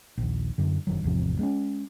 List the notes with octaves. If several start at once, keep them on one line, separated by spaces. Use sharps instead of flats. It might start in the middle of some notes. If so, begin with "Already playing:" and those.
A#1 D#2
F#2 D3
F#1 B1 D#3 F#3
G#1 E2 C3 F3
G#3 A#3 C#4